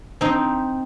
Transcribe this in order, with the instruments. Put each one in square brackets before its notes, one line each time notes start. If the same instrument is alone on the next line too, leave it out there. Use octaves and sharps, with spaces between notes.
[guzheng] C4 D#4